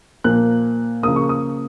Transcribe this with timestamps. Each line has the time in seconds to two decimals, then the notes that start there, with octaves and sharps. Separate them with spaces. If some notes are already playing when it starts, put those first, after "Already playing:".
0.24 A#2 F3 A#3 F#6
1.03 C#3 F3 A#3 D#6
1.16 C#6
1.29 D#6